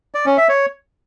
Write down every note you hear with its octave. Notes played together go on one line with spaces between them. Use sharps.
D5
C#4
E5
C#5